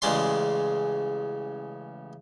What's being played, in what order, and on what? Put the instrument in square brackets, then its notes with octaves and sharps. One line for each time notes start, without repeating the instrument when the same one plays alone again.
[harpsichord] A1 C#3 G#3 D5 C6